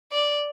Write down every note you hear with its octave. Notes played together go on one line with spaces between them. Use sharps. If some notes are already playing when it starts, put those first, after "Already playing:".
D5